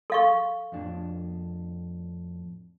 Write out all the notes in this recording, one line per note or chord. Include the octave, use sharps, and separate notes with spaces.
A4 F5 C#6
F2 A2 D4